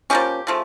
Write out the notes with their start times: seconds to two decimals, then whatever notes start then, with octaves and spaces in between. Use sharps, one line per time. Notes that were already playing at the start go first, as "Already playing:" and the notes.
0.10 F3 A#3 C#4 G4
0.47 C#3 F3 A3